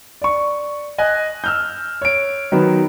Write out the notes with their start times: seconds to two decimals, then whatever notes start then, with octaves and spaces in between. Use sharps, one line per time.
0.22 D5 C#6
0.98 D#5 G#5 F#6
1.44 E6 F6 G6
2.02 C#5 D7
2.52 D#3 F#3 B3